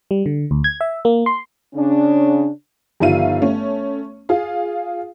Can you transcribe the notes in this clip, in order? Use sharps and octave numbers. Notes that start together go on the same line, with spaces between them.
G3
D3
D2
G#6
E5
A#3
C6
C#3 C#4 D4
G1 D#3 F3 E5 F5 D#7
A3 C#4
F4 G#4 F5